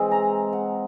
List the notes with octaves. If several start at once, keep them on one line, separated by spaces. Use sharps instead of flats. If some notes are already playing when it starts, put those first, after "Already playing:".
Already playing: E3 G#3 C4
A#5
F#5